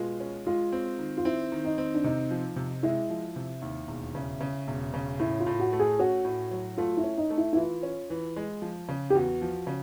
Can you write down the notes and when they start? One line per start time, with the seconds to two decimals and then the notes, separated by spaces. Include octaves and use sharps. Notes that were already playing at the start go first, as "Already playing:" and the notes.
Already playing: B2 G#3 F4
0.20 C#4
0.47 G#3 F4
0.72 C4
0.99 D#3
1.17 F4
1.25 C4 E4
1.52 D#3
1.65 D#4
1.78 C4
1.94 D4
2.04 C3 D#4
2.31 F3
2.56 C3
2.83 G#3 E4
3.10 F3
3.36 C3
3.62 D#2
3.88 E1
4.15 C#3
4.41 C#3
4.68 E1
4.94 C#3
5.20 A2 E4
5.40 F4
5.47 A2
5.60 F#4
5.73 A3
5.79 G#4
5.99 C#4 F#4
6.25 A2
6.51 F#3
6.77 A3 F4
6.97 E4
7.04 C#4
7.17 D#4
7.30 A3
7.37 E4
7.53 E4
7.57 E3 F4
7.83 C#4
8.10 E3
8.36 G#3
8.62 F3
8.89 C#3
9.10 G4
9.15 E2 F#4
9.42 F3
9.67 C#3